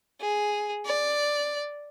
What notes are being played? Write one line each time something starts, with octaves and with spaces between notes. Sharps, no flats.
G#4
D5